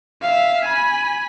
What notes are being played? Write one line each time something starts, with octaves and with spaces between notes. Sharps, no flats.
E5 F5
G#5 B5